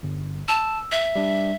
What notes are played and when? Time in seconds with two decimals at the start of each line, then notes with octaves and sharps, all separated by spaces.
0.03 G1
0.48 A5 E6
0.92 E5
1.15 G3 D4